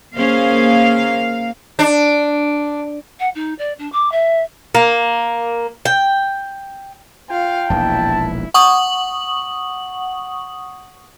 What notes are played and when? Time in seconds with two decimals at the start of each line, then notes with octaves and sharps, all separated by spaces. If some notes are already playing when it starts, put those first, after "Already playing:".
0.16 A#3 C#4 G#4 C5 F5
1.79 D4
3.19 F#5
3.35 D#4
3.58 D5
3.78 D4
3.92 D6
4.11 E5
4.75 A#3
5.85 G5
7.30 F4 F5 G5
7.70 E1 A#1 D#2 E4 A5
8.54 F#5 C#6 D#6 F#7